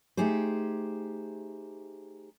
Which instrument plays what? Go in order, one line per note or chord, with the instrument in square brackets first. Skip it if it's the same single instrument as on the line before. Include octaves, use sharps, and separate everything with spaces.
[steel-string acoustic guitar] A3 D#4 G4 G#4 C5